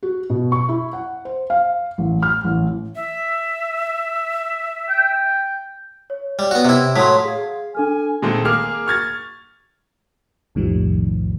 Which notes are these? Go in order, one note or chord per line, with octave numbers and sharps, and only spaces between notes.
F#4
B2
C#6
E4
F#5
C5
F5
A1
F6
A1
E5
G5
C#5
G3
B3 F#4
C3 E4
A2 F#3 C6 D#6 B6
G#4 F5 G#6
D4 A4 G#5 F6
A#2 D#3 G#3 A3 C4
A#3 G#4 D6 F6
C#6 F6 G#6 A6
B1 F2 A2 D#3 F3 G3